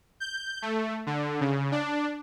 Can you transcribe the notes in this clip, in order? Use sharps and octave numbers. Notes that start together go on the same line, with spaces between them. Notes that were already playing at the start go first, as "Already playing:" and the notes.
G6
A3
D3
C#3
D4